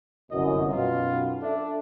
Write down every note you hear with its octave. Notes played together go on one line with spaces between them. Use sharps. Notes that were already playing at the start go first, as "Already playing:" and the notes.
G1 C2 F#2 D#5
B1 F#2 B2 F4
D4 A4 E5